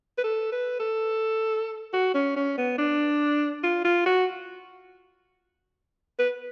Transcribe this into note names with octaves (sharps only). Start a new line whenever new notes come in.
B4
A4
B4
A4
F#4
C#4
C#4
B3
D4
F4
F4
F#4
B4